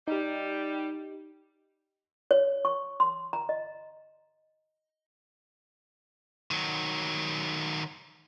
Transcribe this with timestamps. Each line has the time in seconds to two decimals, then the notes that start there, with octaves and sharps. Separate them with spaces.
0.08 G3 D#4 G4
2.31 C#5
2.65 C#6
3.00 C6
3.33 A#5
3.49 D#5
6.51 D#3 F#3